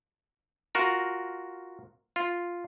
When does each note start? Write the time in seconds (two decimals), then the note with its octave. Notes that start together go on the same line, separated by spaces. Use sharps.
0.75 F4 F#4 A#4
2.16 F4